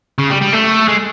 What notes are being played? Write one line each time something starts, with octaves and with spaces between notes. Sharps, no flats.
C#3
G3
G3
A3
G#3